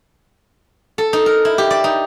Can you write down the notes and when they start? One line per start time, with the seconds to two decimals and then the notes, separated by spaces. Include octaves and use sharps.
0.98 A4
1.13 D#4
1.26 A#4
1.45 E4
1.58 G4
1.70 D5
1.84 D#4